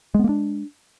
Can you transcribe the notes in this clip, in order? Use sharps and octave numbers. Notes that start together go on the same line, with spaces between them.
G#3 A#3 B3 D4